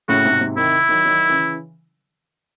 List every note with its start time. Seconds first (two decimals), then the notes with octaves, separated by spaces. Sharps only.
0.08 A2 C#3 F#4
0.24 G#2 C3
0.41 G#2 C3
0.56 C3 D#3 E4
0.89 D#3 F#3
1.05 D#3 F#3
1.29 C#3 E3